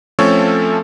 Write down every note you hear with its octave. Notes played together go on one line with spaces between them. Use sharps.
F3 A3 C4 C#4 A4 C#5